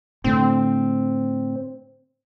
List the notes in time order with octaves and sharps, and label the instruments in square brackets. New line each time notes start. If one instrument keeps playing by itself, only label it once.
[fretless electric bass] A2 D3 [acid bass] C4